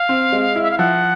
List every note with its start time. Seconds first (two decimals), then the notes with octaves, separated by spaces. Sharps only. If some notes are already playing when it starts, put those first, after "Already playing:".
Already playing: F5
0.09 C4
0.32 G#3
0.56 E4
0.63 E5
0.71 F5
0.78 F3 F#5